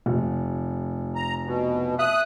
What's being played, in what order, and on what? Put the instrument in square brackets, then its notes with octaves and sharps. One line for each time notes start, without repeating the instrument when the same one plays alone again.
[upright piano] F1
[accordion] A#5
B2
[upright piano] E5 [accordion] D#6 F#6